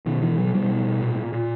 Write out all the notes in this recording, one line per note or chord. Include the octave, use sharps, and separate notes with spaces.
B2 D#3
B2 E3
B2 F#3
B2 G3
B2
B2
A#2
A#2
A#2